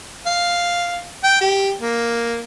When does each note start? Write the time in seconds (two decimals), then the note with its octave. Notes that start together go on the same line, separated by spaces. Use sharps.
0.26 F5
1.23 G5
1.41 G4
1.82 A#3